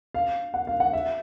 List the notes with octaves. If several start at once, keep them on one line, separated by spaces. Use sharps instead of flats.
F5
F#5
F5
F#5
E5